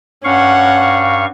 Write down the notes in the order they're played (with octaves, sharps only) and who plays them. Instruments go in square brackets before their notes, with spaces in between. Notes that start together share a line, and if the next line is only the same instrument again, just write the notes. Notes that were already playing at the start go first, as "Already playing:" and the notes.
[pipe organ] G2 F5 C#6 [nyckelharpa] C#4 F#5